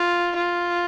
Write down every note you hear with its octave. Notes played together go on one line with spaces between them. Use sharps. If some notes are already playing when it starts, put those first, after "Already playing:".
Already playing: F4
F4